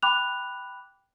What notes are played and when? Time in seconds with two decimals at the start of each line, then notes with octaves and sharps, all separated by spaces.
0.02 G5 B5 D6 F#6 F7